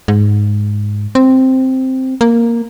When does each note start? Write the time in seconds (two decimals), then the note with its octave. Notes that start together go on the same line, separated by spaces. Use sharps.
0.08 G#2
1.15 C4
2.21 A#3